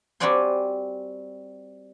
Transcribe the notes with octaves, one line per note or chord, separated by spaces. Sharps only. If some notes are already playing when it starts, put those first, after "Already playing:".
G3 C4 F#4 D5 G#5 C6